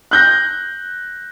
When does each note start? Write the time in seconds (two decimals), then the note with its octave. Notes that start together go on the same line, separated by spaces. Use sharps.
0.11 F#6 G6 A#6